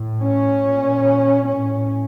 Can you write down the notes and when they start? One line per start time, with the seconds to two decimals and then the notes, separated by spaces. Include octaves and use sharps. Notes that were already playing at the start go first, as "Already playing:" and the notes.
Already playing: A2
0.22 C#4
0.63 A#2
1.45 A2 C#4